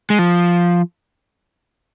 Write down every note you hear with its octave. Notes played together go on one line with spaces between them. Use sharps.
G#3
F3